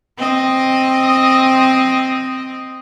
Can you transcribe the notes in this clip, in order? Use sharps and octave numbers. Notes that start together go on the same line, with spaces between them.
C4 D#5